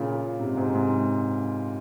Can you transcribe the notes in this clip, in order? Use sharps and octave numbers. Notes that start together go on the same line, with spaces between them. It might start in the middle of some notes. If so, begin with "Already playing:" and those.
Already playing: A#2 C#3
G#2 C3
G#2 C3
G#2 C3